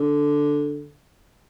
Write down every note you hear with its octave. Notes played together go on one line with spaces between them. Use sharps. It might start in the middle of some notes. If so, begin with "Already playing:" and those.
Already playing: D3